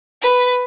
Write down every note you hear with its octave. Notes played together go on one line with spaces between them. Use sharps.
B4